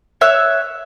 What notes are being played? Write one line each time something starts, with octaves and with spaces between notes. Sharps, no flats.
C#5 E5 F#6